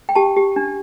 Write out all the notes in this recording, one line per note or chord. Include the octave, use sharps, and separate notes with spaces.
G5
G4 A5
G4
D4